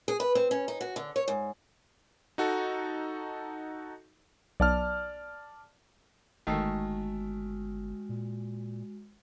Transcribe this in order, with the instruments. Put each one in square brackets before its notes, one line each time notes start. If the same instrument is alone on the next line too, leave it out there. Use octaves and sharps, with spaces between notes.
[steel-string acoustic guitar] G#4
B4
C4
C#4
D#4
F#4
D3
C#5
G#2
[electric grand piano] D#4 F#4 A4
[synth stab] B1 [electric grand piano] D5 A5 F6
[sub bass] G1 [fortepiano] D#3 A3 [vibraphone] G#3 F#4
[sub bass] A#2